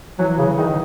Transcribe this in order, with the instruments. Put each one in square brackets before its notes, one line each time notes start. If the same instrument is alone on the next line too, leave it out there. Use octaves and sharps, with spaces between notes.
[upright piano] E3 [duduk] F#3
[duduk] C#3
[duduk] D#3 [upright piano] D#4